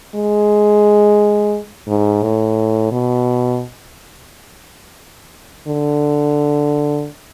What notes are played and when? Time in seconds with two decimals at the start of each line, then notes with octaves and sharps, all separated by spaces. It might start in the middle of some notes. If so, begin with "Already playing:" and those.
0.15 G#3
1.87 G#2
2.23 A2
2.92 B2
5.68 D3